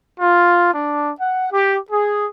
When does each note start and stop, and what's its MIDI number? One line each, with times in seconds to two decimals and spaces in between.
0.20 0.73 65
0.74 1.12 62
1.20 1.48 78
1.52 1.79 67
1.91 2.27 68